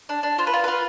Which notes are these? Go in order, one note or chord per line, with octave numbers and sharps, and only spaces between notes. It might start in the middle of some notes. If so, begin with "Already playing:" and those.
D4
D4
F4 C5
B4
F4
F4 B4